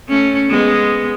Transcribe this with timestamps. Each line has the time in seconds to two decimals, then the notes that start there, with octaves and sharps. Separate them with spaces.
0.09 A3 C#4
0.49 G#3 B3